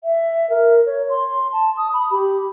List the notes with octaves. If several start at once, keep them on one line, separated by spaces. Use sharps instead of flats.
E5
A#4
C#5
C6
A5
D#6
B5
G4